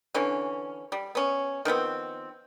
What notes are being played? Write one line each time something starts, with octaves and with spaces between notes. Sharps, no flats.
D3 E3 C#4
G3
B3 C#4
D#3 F3 B3 C4